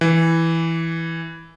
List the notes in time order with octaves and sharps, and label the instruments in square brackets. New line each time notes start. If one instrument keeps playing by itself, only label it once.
[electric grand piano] E3